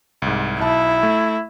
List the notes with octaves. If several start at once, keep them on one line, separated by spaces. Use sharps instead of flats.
C2 G#2
B1 E4 A5
A3